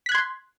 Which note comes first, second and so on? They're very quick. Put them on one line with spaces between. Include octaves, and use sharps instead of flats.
B6 F#6 G#6 C6